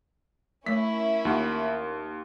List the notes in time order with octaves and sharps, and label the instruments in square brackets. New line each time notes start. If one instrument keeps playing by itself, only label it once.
[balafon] A3 C#5 [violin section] C#4 E4 [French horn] A#4 [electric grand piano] B6
[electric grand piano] D#2 [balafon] F4 F#5